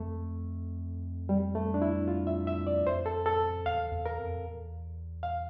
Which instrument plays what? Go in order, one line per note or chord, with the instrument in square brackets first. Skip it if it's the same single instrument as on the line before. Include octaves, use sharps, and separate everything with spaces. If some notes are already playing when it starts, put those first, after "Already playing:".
Already playing: [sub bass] F2 [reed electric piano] A3
[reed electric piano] G3
A3
D4
E4
F4
E5
E5
D5
[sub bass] F2 [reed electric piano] C5
[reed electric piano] A4
A4
[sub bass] E2 [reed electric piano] F5
[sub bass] E2
[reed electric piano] A#4
[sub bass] F2
E2
[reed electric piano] F5